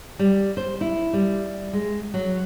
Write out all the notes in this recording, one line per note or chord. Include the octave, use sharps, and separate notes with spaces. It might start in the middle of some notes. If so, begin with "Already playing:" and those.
G3
C5
E4
G3
G#3
F#3